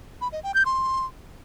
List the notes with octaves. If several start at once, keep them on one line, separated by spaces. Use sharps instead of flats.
B5
D#5
G5
G6
C6